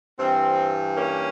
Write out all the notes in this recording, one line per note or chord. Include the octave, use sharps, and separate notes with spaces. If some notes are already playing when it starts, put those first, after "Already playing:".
G2 E3 C4
A#3 C#4